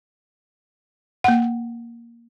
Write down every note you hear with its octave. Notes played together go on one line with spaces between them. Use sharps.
A#3 F#5